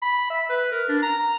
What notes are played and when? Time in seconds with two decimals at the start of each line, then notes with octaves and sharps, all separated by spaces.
0.02 B5
0.30 E5
0.49 B4
0.72 A#4
0.89 D4
1.03 A#5